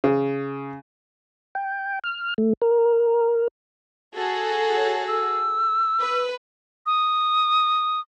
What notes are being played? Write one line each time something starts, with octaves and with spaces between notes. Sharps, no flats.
C#3
G5
F6
A3
A#4
F#4 G#4 A4
C#5
E6
B4
D#6